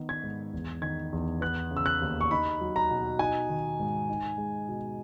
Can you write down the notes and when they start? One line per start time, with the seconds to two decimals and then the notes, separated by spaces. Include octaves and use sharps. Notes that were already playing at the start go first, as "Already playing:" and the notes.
Already playing: D#3 B3
0.09 G#6
0.23 G#2
0.53 E2
0.82 D#3 G#6
1.13 E2
1.41 B3 F#6
1.71 C#3
1.77 E6
1.86 F#6
2.01 D#2
2.21 C#6
2.31 D#4 B5
2.61 F#3
2.76 A#5
2.91 B2
3.19 D#4 G#5
3.50 D#3
3.80 G#2
4.09 D#4
4.38 G#3
4.68 B2